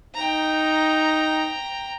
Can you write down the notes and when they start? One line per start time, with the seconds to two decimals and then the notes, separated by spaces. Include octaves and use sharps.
0.15 D#4 G5 A#5